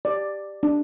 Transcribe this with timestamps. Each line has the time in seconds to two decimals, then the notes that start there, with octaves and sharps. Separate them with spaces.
0.05 D5
0.63 D4